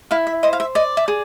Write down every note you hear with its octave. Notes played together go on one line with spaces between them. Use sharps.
E4 F5
E5
C5 D#5
F5
E5
D5 D#5
E5
G#4